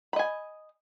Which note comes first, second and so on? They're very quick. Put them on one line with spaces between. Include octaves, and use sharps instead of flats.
B5 D#5 G#5